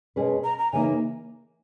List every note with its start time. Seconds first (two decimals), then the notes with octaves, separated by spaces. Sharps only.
0.16 B2 G#3 C#4 G#4 B4
0.44 A#5
0.59 A#5
0.72 C#3 E3 A#3 D#4 G#5